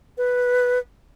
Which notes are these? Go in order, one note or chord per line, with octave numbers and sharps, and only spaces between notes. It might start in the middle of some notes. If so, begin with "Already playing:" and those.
B4